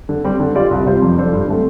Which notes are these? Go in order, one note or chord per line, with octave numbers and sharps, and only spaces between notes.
D3
G3 C4 G4
D3
G3 F4 D5
C2
C3 G3 F4 C5
F2
F3 D4 A4 C5
G2
D3 A3 C4